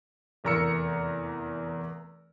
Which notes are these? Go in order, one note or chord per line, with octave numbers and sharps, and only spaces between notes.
F1 E2 A#4 A#5 E6 C#7